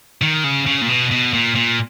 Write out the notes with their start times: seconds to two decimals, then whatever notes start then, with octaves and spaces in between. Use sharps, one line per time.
0.22 D#3
0.44 C#3
0.66 C#3
0.81 A#2
0.89 B2
1.11 B2
1.33 A#2
1.56 A#2